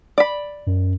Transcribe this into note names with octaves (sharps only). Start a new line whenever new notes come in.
D5 B5
F#2